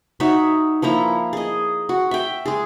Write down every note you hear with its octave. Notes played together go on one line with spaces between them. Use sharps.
D#4 F#4 C#5 E5
F3 A#3 E4 A#5
G#4 D#5
F#4
E5 G5
G#3 G#4